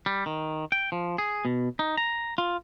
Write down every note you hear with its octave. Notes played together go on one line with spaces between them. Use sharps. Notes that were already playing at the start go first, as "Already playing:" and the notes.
G3
D#3
G5
F3
G#4
B2
D#4
A#5
F4